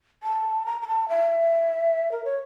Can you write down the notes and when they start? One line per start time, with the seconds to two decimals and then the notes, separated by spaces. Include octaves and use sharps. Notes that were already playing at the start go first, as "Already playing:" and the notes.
0.23 A5
0.66 A#5
0.82 A#5
0.88 A5
1.09 E5
2.12 A#4
2.25 C#5